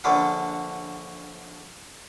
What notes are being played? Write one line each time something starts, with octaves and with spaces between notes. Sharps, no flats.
A#1 D3 C#4 D4 B4 F#5